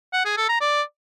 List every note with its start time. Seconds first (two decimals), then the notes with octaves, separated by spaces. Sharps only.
0.13 F#5
0.25 G#4
0.37 A4
0.49 A#5
0.61 D5